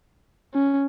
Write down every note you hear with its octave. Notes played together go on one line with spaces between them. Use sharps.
C#4